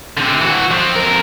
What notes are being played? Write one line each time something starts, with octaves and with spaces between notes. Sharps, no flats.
D3 C4
E3 F#4
F3 C4
F2 A#4